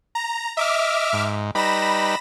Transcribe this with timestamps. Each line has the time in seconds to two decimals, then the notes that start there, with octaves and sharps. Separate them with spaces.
0.15 A#5
0.57 D#5 E5 D6 F6
1.13 G#2
1.55 G3 D#4 B4 B5 A#6 E7